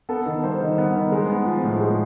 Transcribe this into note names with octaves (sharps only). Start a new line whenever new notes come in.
B3 A4
D#3
G3 C5
D#3
B3
D#3
G#3
B3
F3
A2
G#3